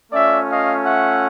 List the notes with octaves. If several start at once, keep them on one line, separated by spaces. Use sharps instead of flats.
A3 C#4 F4 D5 E5
D#5 F5
E5 F#5